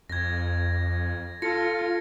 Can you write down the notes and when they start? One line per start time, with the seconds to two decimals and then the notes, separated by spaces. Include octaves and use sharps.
0.09 F2 G#6 A#6
1.42 F4 A4 A#6 C#7